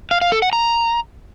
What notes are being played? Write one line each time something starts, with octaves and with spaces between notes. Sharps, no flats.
F5
F5
A4
F#5
A#5